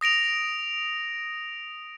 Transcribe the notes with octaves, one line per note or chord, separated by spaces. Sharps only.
D#6 A#6 D7 F7